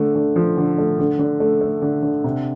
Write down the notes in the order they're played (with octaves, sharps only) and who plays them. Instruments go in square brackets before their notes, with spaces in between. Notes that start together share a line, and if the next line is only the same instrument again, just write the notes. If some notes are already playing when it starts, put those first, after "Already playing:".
Already playing: [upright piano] D3 A3
D3
F3
D3
A3
D3
D3
A3
A3
D3
D3
C3